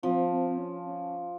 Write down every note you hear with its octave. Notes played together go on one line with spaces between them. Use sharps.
F3 C4
C4
C4
C#4
C#4